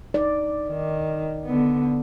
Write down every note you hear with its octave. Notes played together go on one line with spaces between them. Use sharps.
D#4 D5
D#3
D3 B3